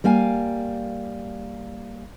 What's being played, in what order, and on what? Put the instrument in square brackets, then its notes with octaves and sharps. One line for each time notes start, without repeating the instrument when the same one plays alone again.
[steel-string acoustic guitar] G3 A#3 F5 G#5